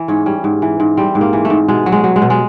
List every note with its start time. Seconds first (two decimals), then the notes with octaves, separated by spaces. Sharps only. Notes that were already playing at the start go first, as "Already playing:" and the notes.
Already playing: E3
0.08 G#2 C#4
0.26 G3 C#4
0.44 G#2
0.62 E3
0.80 G#2
0.97 G3 C4
1.15 G#2
1.21 A#3
1.33 E3
1.45 A3
1.50 G#2
1.68 B2 G#3
1.86 F#3
1.92 G#3
2.04 F#3
2.16 G#3
2.22 B2
2.30 G#3